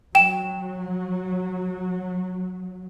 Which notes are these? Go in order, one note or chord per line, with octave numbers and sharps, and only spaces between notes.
F#3 G5 E7